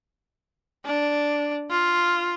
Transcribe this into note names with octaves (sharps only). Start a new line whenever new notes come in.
D4
F4